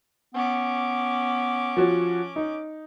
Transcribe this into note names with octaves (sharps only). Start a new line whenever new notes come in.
B3 C#4 D6
F3 F#4 C#5
D#4